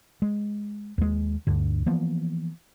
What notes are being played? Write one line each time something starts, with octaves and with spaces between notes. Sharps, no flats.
G#3
D#2 G#3
D2 G2 D3
E3 F3 A#3 B3